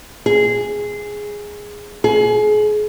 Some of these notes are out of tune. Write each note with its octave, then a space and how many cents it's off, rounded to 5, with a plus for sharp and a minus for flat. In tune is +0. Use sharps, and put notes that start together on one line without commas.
G#4 -5
G#4 +30